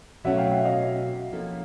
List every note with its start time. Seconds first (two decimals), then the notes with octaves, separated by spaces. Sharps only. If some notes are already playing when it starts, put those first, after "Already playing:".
0.24 B2 F#3 A3 C#4 E5 F#5
0.38 F5 G5
0.51 E5 F#5
0.65 D#5 F5
1.32 F3 A#3 C#4 E4 A4